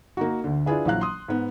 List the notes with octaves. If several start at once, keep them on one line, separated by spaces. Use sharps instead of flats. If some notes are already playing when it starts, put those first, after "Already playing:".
A#3 D#4 F#4
D2 D3
D4 E4 F4 G#4 B4
A#1 E3 F#3 F5 F#6
C6 D#6
G#2 B3